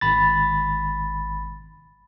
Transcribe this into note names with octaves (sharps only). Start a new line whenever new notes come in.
G#1 B5 A6